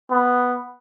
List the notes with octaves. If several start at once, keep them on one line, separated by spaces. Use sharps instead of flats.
B3